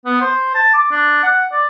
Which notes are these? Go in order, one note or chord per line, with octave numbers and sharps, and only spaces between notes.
B3
C5
A5
D6
D4
F#5
D5